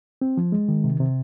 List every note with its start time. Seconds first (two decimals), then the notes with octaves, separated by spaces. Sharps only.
0.22 C4
0.37 F3
0.52 G#3
0.69 D#3
0.84 C3
1.00 C3